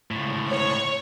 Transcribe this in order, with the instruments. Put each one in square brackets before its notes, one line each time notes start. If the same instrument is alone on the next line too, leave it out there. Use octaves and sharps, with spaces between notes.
[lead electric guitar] C#2 A2
[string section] C#5